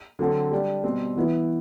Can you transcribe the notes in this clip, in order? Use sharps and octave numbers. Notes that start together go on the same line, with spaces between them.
D3 F#3 C4 F#4 A4
G3 D4 G4
B2 G3 C4
E3 B3 E4 B4